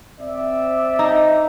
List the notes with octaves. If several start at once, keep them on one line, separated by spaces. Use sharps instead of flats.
C4 D5 E5
D#4